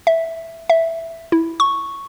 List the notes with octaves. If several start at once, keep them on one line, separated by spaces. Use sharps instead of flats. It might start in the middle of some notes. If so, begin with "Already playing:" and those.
E5
E5
E4
C#6